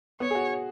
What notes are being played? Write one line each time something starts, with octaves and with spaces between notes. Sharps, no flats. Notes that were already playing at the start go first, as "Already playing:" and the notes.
B3 C#5
G#4
F#4